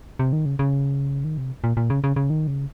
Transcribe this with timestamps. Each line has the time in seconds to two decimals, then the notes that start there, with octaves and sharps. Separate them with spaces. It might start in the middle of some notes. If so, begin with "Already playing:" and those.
0.19 C3
0.33 D#3
0.46 C#3
0.59 C#3
1.24 D#3
1.38 C3
1.64 A#2
1.77 A#2
1.90 C#3
2.04 C#3
2.16 C#3
2.30 D#3
2.47 C#3